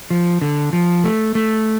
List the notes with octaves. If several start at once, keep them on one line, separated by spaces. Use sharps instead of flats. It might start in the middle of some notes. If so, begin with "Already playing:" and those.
F3
D3
F3
A3
A3